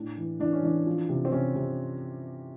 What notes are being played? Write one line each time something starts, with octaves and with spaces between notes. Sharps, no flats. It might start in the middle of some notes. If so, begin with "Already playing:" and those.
Already playing: A2 D4
E3
E3 D4
C#4
E3 D4
F3
C3
C4
C3 C#4
C3